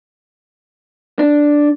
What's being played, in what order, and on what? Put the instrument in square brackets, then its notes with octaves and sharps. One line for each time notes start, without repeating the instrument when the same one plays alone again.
[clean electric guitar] D4